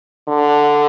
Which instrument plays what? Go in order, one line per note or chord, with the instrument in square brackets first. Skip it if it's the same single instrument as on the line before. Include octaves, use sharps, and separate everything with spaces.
[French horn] D3